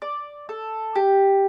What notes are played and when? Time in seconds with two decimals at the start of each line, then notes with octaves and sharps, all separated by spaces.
0.02 D5
0.49 A4
0.96 G4